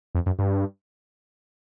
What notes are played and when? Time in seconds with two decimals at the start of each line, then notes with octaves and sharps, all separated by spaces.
0.15 F2
0.26 F#2
0.39 G2